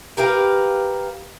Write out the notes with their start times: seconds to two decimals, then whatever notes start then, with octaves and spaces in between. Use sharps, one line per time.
0.17 G4 A#4 B4 F5